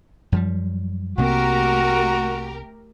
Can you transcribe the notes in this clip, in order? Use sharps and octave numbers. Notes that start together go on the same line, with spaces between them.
F#2 F3 G3
C2 C3 A3 A#3 F#4 G4 A#4